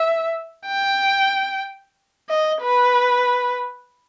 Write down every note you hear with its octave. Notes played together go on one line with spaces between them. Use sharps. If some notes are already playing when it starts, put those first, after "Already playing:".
Already playing: E5
G5
D#5
B4